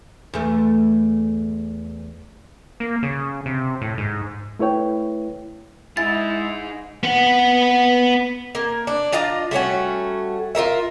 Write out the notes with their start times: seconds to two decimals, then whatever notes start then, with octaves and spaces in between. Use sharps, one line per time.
0.34 E2 A3
2.80 A#3
3.03 C#3
3.46 C3
3.82 A2
3.98 G#2
4.59 A3 E4 B4 C#5 G5
5.97 G#3 D#4 E4 G#4 A6
7.03 B3 F#5
8.55 A#3 A#4
8.87 D4
9.12 D4 F4 D#5 A#5
9.51 G3 A3 C#4 F#4
10.55 F4 G4 A#4 E5